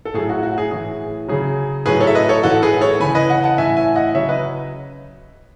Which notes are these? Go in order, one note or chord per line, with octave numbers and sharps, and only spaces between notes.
A4
A2 F#3 G#4
F#4
F#4
G#4
A2 E3 G#4
C#3 F#3 G#4
A2 F#3 G#4 B4
A4 C#5
E5
B4 D#5
A4 C#5
A2 E3 F#4 A4
G#4 B4
A4 C#5
C#3 E3 G#5 B5
B4 D#5
D#5 F#5
F#5 A5
A2 E3 E5 G#5
E5 G#5
D#5 F#5
C#3 F#3 C#5 E5
B4 D#5